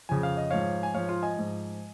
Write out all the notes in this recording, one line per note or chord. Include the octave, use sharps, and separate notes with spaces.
F2 C#3 F3 G#5
F5
D#5
G#2 F3 C#5 F5
G#5
G#2 F3 C#5 F5
F4
D#5 G#5
G#2 F3